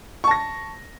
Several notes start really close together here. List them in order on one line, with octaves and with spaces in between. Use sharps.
C#6 A5 A#6